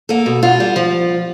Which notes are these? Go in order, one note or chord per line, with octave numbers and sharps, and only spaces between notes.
A#3 A4
B2
B2 F4
G3
F3